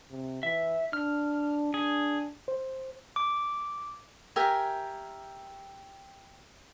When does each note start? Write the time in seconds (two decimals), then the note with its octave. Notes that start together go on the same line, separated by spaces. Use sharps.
0.11 C3
0.43 E3 E5
0.93 D4 F6
1.74 D4 G#4
2.48 C5
3.16 D6
4.36 G4 A#4 E5 G#5